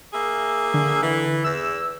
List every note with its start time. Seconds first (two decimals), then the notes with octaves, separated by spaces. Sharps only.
0.13 A#3 G#4 E5
0.74 D3
1.02 E3
1.44 E2 E6